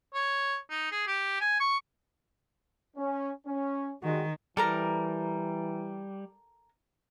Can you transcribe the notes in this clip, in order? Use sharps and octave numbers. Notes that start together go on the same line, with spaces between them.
C#5
D#4
G#4
G4
G#5
C#6
C#4
C#4
D#3 G3 G#3 F#4
E3 G3 A4 A#4 A#5